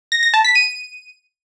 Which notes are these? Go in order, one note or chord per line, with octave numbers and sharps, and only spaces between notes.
A#6
A#6
A5
B6
D#7